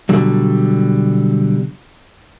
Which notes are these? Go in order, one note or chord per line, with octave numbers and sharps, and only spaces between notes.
B2 D3 F#3 G3